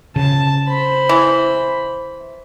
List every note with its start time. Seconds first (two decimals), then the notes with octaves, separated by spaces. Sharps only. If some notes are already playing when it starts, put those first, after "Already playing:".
0.16 C#3 A5
0.68 C5 B5
1.09 E3